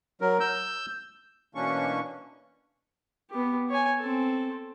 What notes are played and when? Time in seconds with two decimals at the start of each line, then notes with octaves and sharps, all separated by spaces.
0.21 F#3 A#4
0.40 E6 G6
1.55 B2 E3 A#3 C#4 D4 C#6
3.30 B3 G4
3.69 C#5 G#5
4.00 C4 A4